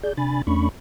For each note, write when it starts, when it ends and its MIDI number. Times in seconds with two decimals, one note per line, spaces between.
0.03 0.13 68
0.03 0.13 74
0.03 0.13 91
0.17 0.42 48
0.17 0.42 62
0.17 0.42 80
0.17 0.42 83
0.17 0.42 93
0.47 0.69 40
0.47 0.69 57
0.47 0.69 61
0.47 0.69 62
0.47 0.69 83
0.47 0.69 85